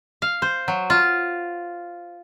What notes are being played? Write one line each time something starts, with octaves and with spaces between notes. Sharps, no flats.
F5
C5
F#3
F4